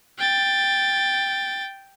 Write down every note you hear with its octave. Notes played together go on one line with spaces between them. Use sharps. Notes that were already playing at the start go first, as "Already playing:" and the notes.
G5 A6